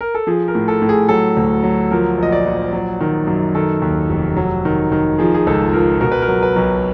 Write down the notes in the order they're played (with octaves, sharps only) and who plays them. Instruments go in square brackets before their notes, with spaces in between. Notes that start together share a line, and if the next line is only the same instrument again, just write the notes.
[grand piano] A#4
A4
F3 G#4
A#4
A2
A4
A2
G#4
F#3 A4
D2
F#3
F3 A#4
A#1 D#5
D5
A#1
F#3
D#3
F#2
D#3 A4
D#2
F1
F#3
D#3
D#3
F3 G#4
G#4
C#2 A4
F3 A#4
B2 A#4
B4
A#4
F#3
B4
B1